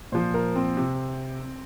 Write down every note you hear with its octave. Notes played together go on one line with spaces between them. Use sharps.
A#2 F3 C5
A#4
C4
C3